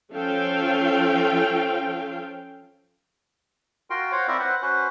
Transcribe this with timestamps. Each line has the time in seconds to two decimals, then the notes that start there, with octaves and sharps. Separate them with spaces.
0.13 F3 C#4 A4 F5 G5
3.90 F4 F#4 A#4 G5 C6
4.12 C5 C#5 F5 F#5
4.28 C4 E4 F4 A#4 D5 E5
4.40 B4 C5 F#5
4.62 C#4 F#4 B4 C5